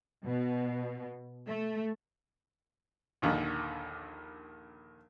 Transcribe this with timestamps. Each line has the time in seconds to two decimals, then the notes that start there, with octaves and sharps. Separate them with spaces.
0.24 B2
1.48 A3
3.22 A#1 D#2 D3 D#3